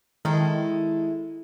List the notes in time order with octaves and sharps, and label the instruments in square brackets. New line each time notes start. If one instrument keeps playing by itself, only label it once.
[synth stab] D#3 [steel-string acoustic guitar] G#3 E4 A4